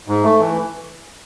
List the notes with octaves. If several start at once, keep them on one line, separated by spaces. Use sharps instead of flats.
G#2
A3
E3